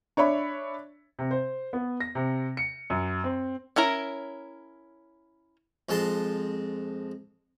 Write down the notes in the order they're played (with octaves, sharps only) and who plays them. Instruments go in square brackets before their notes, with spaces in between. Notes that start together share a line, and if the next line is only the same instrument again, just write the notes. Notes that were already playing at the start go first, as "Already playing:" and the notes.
[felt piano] D4 C#5 E5 B5
[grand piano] C3
C5
B3
A#6
C3
C#7
F#2
C4
[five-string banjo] C#4 E4 A#4 A#5
[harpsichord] F2 G#3 A5 C6